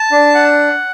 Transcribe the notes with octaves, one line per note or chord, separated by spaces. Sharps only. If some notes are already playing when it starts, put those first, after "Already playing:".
Already playing: A5
D4
F#5